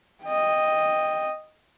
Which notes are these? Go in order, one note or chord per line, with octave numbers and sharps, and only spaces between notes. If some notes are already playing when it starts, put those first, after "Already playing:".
D#5 G5